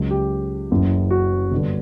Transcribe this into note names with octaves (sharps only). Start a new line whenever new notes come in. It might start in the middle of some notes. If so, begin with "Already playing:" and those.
Already playing: C#2 C#3 F#3
G4
F#1 F#2 C#3 E3
F#4
G1 G2 D3